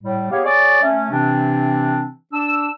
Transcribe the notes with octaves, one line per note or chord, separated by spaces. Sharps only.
A2 G3
B3 G4 G#4 C#5 F5
G#4 C#5 D5
A3 C#4
C3 E3 C4 D4
D4 E6